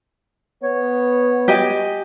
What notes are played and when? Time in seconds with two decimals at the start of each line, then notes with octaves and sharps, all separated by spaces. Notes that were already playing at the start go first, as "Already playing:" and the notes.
0.63 B3 C#5
1.48 G4 D#5 G#5